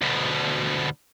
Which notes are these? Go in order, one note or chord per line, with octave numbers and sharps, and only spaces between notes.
D2 B2